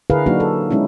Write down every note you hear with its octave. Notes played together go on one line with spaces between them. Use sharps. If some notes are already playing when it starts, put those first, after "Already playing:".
D3 E4 G#4 A#4 B4 F5
F#3 A#3 D4 D#4 F#4
A4
G#3 C#4 D#4 E4